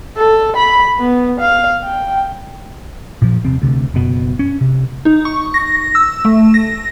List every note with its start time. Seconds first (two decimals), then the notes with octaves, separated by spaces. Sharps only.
0.17 A4
0.56 B5
0.99 B3
1.40 F5
1.84 G5
3.22 A#2 F3
3.45 D#1 C3 C4
3.62 D2 C3
3.94 F#1 B2
4.39 C#4
4.61 C3
5.05 D#4
5.25 C#6
5.54 A#6
5.95 E6
6.25 A3
6.54 A#6